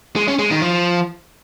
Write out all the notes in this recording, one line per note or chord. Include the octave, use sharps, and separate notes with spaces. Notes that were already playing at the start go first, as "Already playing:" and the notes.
G#3
C#4
G#3
D#3
F3